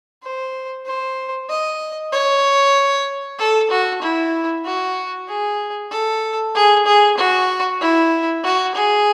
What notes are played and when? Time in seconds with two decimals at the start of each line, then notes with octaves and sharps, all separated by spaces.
0.23 C5
0.86 C5
1.49 D#5
2.12 C#5
3.39 A4
3.70 F#4
4.02 E4
4.65 F#4
5.28 G#4
5.91 A4
6.55 G#4
6.86 G#4
7.17 F#4
7.81 E4
8.44 F#4
8.75 G#4